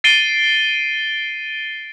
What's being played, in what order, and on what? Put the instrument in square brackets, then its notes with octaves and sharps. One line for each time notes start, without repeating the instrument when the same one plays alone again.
[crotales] A6 C7 D7 D#7 G7